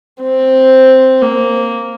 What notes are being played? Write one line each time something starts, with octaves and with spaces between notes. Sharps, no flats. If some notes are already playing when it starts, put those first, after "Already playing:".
C4
A#3